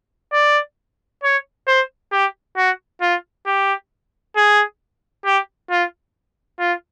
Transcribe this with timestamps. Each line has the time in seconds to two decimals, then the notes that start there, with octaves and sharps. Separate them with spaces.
0.33 D5
1.23 C#5
1.67 C5
2.12 G4
2.57 F#4
3.01 F4
3.46 G4
4.36 G#4
5.25 G4
5.70 F4
6.59 F4